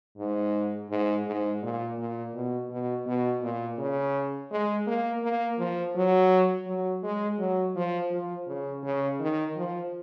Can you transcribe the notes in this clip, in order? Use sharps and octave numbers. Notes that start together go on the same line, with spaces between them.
G#2
G#2
G#2
A#2
A#2
B2
B2
B2
A#2
C#3
G#3
A#3
A#3
F3
F#3
F#3
G#3
F#3
F3
F3
C#3
C#3
D#3
F3